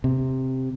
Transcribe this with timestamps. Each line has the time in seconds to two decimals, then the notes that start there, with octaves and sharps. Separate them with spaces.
0.04 C3